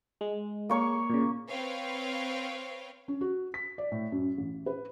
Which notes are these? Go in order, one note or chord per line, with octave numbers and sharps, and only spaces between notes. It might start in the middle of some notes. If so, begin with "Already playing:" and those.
G#3
A#3 C#5 C#6
A#2 C#3
C4 B4 C#5 F5 G5
C#4
F#4
B6
D5
A2
F#2
A1
B4